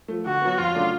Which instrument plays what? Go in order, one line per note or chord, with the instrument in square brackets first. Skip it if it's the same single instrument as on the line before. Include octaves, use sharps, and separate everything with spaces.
[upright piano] F3 A3
[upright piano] D3 [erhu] F#4
[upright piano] F#3 B3
[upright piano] F2 [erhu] F4
[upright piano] C#3 F#3 A3 D4